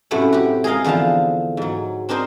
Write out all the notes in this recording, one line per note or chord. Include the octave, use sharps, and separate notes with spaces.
F#2 A2 C3 A3 B4 F#5
F#4 G4
G#4 A#4 D#5 F5
E2 D3 F3 F5 A5
G#2 F#3
C4 D4 A#4 C5 D#5